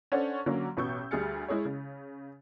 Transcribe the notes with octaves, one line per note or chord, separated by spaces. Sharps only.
C#4 D4 A4 C5 C#5 F#5
D3 F#3 A#3 C#4
A1 B2 B3 C#6 E6 G6
D2 G3 G#4 F6 A6 C#7
G#3 E4 G#4 C#5
C#3